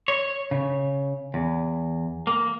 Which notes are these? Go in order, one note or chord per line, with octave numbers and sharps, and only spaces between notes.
C#5
C#3
E2
A#3